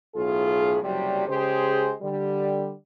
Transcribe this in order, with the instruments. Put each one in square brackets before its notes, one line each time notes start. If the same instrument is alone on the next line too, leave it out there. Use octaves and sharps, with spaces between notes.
[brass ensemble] B1 A2 F4 G#4
F#1 C3 F#3 G3
C#3 G#3 G4 G#4 C5
D3 G3